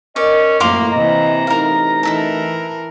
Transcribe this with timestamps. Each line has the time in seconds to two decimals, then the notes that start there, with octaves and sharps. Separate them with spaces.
0.16 C#4 A#4 D5 D#5
0.60 F#2 A2 F3 A#3 F5 C6 D6
0.92 C3 E3 A#3 D#5 A#5
1.47 A1 D#4 A#4 F5
2.03 E3 A4 A#4 E5 A5